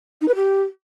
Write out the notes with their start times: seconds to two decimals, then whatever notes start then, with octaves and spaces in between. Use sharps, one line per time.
0.21 D#4
0.28 B4
0.35 G4